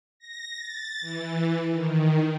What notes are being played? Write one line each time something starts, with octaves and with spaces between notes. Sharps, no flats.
A#6
A6
E3
D#3